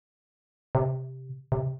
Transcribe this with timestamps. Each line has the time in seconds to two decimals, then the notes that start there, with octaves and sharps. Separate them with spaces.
0.75 C3
1.52 C3